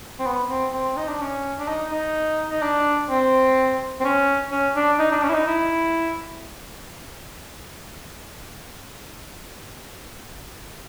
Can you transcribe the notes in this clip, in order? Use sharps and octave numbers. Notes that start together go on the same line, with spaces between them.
C4
B3
C4
C4
D#4
D4
C#4
D4
D#4
D#4
D#4
D4
C4
C4
C#4
C#4
D4
D#4
D4
C#4
E4
D#4
E4